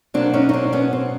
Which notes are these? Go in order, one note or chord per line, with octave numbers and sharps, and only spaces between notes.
B2 F#3 A#3 C4 D4
C#4 D#4
D#4
C4 D4
B3 C#4
C4